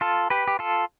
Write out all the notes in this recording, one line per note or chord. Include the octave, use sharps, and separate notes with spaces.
F4 A4
G4 B4
G4
F4 A4